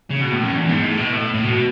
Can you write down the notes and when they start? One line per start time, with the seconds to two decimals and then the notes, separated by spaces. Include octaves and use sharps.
0.11 C#3
0.21 B2
0.32 A2
0.44 F#2
0.56 E2
0.69 G#2
0.85 A2
0.98 B2
1.13 A2
1.34 A2
1.44 B2